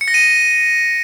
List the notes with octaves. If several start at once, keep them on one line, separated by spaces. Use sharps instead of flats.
C#7
A#6
D#7